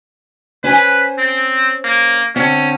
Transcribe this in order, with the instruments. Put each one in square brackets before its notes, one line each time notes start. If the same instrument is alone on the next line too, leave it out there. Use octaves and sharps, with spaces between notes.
[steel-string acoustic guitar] C#4 C5 G#5 [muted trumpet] B4
[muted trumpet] C4
A#3
[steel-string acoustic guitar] D3 C4 [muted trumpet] C#4